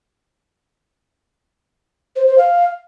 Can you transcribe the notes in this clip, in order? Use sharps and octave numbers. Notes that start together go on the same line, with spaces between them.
C5
C5
F5